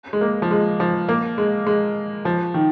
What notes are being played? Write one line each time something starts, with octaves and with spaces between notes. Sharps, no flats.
G#3
A#3
F3
G#3
F3
A#3
G#3
G#3
F3
D#3